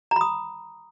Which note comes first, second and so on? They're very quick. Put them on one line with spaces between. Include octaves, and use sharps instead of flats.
A#5 B5 D#6